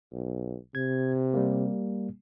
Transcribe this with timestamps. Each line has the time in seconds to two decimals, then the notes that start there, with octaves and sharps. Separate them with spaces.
0.12 B1
0.75 C3 G#6
1.34 G3 A#3